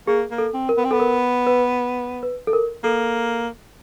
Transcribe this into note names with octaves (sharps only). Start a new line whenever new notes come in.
A#3 G#4
A#3
A4
C4
A#4
B3
C4
B3 A4
A#4
B4
B4
A4
A#4
A#3 A4